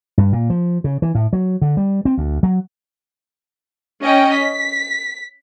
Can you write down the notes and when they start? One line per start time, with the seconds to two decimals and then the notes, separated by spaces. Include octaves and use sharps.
0.18 G2
0.33 A#2
0.50 F3
0.84 C#3
1.02 E3
1.15 A2
1.33 F#3
1.61 D3
1.77 G3
2.05 C4
2.18 D2
2.43 F#3
4.03 C#4 D#5 G5
4.34 B6